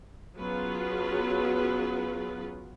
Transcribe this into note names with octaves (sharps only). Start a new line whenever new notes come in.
F#3 B3 C#4 F4 G#4 B4